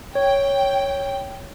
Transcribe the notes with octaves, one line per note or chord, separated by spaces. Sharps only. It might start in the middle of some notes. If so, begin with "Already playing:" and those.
C#5 G5